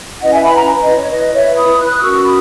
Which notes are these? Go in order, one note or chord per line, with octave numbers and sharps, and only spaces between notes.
C#4 E4 B4 D#5 F#5
E5 G#5
G#5 B5
F#5 A#5
D#5
C#5
E4 B4 D#5
C#5 E5
B5 D#6
D#6 F#6
C#4 F#4 A#4 C#6 E6
B5 D#6